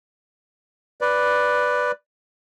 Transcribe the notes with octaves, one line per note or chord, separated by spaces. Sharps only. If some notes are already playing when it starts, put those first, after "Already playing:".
B4 D5